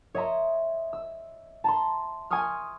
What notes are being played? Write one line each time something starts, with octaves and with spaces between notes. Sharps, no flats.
C#5 D#5 E5 A#5 C6
E6
A5 A#5 C6
G#5 C6 C#6 D#6 F6